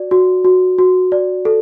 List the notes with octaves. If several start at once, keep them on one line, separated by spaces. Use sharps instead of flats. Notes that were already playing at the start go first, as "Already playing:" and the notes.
Already playing: F#4 D5
F#4
F#4
F#4
D5
A4